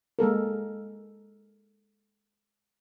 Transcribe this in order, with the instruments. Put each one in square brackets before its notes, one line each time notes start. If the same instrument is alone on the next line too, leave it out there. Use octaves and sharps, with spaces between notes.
[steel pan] G#3 A#3 A4 A#4